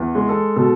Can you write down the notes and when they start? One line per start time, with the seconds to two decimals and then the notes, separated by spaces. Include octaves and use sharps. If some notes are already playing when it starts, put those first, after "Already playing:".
Already playing: E2
0.15 G#3
0.29 A4
0.56 B2 A4